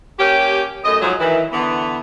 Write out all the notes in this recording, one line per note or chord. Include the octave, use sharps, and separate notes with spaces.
A#3 C#4 G4
F#2 A3 D#5
G#2 F3 F#3
D#3 E3
D3 E3 B3